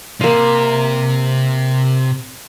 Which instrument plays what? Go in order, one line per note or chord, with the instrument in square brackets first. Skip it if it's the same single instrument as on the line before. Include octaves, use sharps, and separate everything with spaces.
[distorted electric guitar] C3 [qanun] A#3 F5